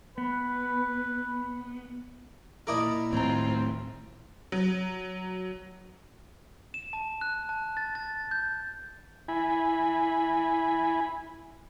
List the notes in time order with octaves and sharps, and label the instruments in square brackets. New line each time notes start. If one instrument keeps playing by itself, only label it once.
[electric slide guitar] B3 [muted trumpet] B4
[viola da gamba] A#2 [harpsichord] D#4 E4 A4 [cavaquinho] A#4 D5 D#6
[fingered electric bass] D1 A2 D#3 [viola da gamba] C4 F4 [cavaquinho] C#5 A#5
[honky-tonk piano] F#3
[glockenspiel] E7
A5
F#6
A5
A6
A6
G6
[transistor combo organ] E4 G#5 B5